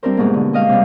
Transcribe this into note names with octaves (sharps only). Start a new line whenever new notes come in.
G3 C4 D4 E4 A#4 C5
G#2 B2 A#3
D3
G#3 D#5 F5
C3 G3